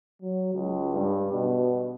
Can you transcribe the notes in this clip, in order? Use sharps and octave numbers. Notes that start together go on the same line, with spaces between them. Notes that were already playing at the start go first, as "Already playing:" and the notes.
F#3
C#2
G2
B2